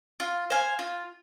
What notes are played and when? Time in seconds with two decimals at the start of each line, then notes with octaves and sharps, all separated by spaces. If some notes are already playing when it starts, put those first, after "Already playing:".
0.20 F4
0.50 C5 F5 G#5
0.79 F4